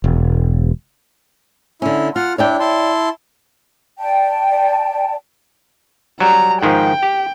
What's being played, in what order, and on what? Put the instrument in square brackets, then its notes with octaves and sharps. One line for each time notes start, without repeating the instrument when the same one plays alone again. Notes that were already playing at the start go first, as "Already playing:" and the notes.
[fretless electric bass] E1
[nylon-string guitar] D3 C#4 [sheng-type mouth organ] E4
[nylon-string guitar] F4 [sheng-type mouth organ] F#5 F6
[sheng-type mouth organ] D4 E4 [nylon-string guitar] C#5 D5 G5
[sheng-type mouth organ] E4 A5 C6
[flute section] D5 G5 A5
[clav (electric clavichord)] F#3 G3 [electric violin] A#5
[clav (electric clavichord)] G#2 D#3 F3 [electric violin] G5
[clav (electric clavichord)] G4